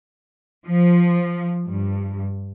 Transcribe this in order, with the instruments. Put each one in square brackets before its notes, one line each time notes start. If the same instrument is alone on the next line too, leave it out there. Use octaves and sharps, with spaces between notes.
[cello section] F3
G2